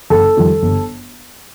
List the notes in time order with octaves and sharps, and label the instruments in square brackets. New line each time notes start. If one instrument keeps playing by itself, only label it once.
[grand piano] G1 A4
F2 D#3 G3
G1